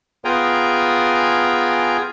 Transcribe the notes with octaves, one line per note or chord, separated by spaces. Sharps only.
B3 F4 G#4 G5 G#5 A#5